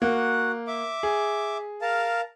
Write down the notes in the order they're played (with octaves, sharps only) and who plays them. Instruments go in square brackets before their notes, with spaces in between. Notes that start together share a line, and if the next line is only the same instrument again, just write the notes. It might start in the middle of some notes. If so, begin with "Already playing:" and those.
[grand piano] A#3 [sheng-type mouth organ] F#4 F#5
[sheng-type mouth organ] E5 D6
[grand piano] G#4
[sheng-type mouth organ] A#4 F5 A5